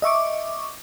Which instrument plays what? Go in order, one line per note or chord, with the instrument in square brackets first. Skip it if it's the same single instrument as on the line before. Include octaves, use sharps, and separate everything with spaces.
[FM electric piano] D#5 E5 C#6 D6